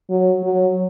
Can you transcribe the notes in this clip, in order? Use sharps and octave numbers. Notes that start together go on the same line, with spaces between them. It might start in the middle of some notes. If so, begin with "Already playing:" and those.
F#3
F#3